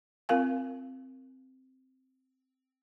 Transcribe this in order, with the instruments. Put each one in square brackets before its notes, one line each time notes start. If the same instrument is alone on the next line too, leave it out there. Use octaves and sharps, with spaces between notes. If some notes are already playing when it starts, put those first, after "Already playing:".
[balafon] C4 F4 A#4 F5 G#5